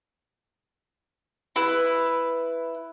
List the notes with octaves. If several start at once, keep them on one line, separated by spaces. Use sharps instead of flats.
E4 B4